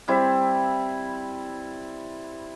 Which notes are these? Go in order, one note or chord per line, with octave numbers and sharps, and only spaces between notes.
G3 C4 E4